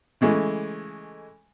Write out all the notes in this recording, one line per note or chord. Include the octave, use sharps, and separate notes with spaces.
C#3 E3 G#3 A3